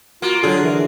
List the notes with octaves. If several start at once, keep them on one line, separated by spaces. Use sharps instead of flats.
A#3 F4 F#4
D3 F#3 G#4 A4
E3 A#4
E3